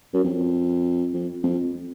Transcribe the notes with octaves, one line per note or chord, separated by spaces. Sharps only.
F#2
F2
F2
F2